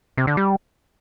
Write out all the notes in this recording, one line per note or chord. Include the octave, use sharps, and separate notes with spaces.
C3
D3
G3